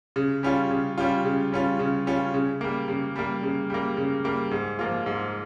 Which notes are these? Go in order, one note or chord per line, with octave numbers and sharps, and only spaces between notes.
C#3
G3 C#4 F4
C#3
G3 C#4 F4
C#3
G3 C#4 F4
C#3
G3 C#4 F4
C#3
G3 A#3
C#3
G3 A#3
C#3
G3 A#3
C#3
G3 A#3
G#2
F3 A#3 F4
G#2